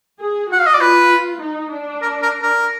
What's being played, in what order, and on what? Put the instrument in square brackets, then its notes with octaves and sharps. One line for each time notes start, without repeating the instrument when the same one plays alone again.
[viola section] G#4
[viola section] F#4 [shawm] F#5
[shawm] F5
D#5
D5
[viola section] F4 [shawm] B4
[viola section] D#4
D4
[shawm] A#4
A#4
A#4